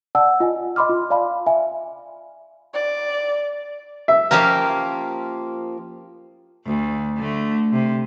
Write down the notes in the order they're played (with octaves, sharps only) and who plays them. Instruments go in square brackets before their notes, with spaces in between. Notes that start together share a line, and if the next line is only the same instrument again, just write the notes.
[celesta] D5 F#5 A5 E6
F4 D#5 G#5
D#5 B5 C6 D6 F6
F4
D5 F5 A5 B5
E5 G#5
[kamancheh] D5
[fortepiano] E5
[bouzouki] F3 A#3 F5 [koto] C#4 G4 A#4
[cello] D2
D3 A3
C3